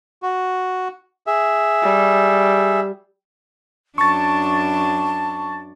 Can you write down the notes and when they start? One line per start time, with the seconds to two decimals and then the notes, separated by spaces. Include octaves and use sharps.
0.23 F#4
1.27 G#4 E5
1.83 G3
3.98 F#2 D4 A5 C#6 A6